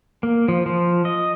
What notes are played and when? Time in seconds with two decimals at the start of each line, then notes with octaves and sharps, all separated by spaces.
0.23 A#3
0.48 F3
0.66 F3
1.05 D#5